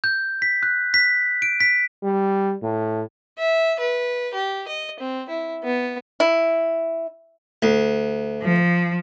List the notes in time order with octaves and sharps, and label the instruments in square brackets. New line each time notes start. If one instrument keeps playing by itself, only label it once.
[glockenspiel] G6
B6
F#6
B6
D7
B6
[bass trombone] G3
A2
[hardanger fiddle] E5
B4
G4
D#5
C4
E4
B3
[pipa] E4
[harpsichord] D2
[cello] F3